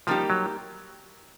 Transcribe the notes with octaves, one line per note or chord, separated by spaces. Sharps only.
F3 G3 A#3 D#4 G4
F#3